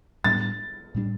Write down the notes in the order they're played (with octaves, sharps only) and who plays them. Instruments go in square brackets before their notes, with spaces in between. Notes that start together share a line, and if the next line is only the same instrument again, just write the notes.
[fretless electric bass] A2 G3 B3 D4 [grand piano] A6
[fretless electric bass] A2 G3 B3 D4